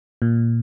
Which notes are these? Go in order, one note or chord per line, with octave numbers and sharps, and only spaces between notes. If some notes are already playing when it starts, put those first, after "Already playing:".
A#2